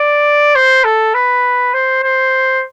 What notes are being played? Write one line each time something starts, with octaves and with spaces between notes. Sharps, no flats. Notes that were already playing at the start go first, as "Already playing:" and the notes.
Already playing: D5
C5
A4
B4
C5
C5